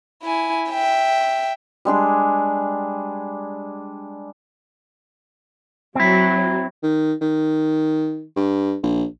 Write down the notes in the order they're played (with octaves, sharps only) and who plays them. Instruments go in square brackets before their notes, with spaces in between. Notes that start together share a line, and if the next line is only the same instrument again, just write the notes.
[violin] E4 G#5
E5 G5
[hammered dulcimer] G3 G#3 D4 G#4
[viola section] F#3 [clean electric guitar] C4 E4
[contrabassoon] D#3
D#3
G2
A#1